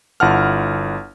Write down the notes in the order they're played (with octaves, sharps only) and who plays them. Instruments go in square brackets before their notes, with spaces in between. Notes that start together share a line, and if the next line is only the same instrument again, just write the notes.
[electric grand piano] G1 E4 F4 F#5 A5 F6